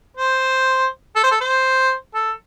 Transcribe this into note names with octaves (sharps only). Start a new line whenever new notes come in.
C5
A4
C5
A4
C5
A4